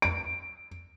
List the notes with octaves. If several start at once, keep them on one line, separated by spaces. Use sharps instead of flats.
D7